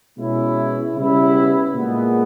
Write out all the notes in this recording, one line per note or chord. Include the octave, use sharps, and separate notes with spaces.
B2 G#3 C#4 E4
C#3 G3 B3 E4
A#2 G#3 B3